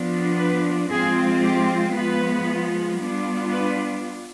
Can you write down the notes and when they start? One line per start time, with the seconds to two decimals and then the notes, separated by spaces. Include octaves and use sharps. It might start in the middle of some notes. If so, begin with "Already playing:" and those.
Already playing: F3 B3 D4 F4
0.37 B4
0.90 F3 G#3 C4 F4 G#4
1.43 G4
1.95 F3 G#3 B3 F4 B4
2.99 G3 B3 D4 F4
3.51 B4